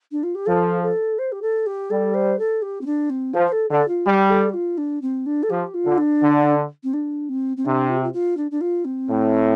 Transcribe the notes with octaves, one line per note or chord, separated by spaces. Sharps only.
D4
F4
G4
F3 A4
A4
C5
G4
A4
G4
G3 A4
C5
A4
G4
C4
D4
C4
F3 C5
C5
A4
D3 A4
F4
G3 G4
A4
G4
F4
D4
C4
D4
A4
F3 G4
F4
D3
D4
D3
C4
D4
C4
C4
C3 D4
F4
G4
F4
F4
D4
D4
F4
C4
A2